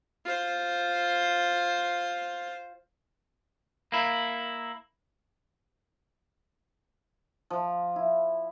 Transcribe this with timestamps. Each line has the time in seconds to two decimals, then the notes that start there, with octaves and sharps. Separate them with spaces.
0.25 F4 C5
3.92 A#3 E4
7.50 F3
7.96 E4